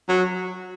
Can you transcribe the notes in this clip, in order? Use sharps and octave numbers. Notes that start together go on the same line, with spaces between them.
F#3